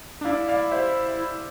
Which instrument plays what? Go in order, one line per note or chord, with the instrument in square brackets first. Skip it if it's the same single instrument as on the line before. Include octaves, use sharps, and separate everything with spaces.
[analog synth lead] D4
[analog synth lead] E4 [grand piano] D5 F5
[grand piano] D5 F5
C5 E5